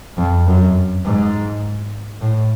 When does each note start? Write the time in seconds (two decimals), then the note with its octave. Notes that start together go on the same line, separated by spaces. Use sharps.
0.18 F2
0.47 F#2
1.05 G#2
2.21 A2